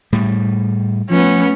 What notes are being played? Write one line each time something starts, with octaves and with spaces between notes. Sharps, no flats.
A2 G3
F3 A3 B3 C#4